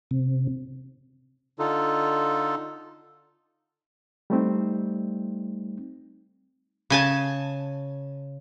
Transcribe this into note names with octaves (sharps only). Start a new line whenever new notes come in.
C3
D3 D#4 F4 A4
G3 A3 C4 D#4
C#3 G#5 A5